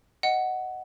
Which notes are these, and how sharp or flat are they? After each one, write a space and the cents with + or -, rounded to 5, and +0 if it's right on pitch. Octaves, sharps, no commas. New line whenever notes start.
D#5 +0 F#5 +10